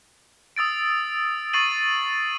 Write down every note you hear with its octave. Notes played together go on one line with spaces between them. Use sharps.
D#6 E6 A6 D7
C#6 A6 C7 D#7 F#7